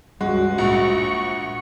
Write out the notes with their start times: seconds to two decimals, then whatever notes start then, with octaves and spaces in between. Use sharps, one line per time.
0.21 C#2 G2 G#3 F#4
0.58 A#1 C#6